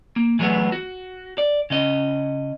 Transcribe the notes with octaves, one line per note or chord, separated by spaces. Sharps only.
A#3
E3 F#3 G#3 A3 B3
F#4
D5
C#3 C#4 D#5